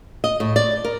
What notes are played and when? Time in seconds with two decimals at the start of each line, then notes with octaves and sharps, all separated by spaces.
0.24 D#5
0.40 A2
0.56 D5
0.85 A#4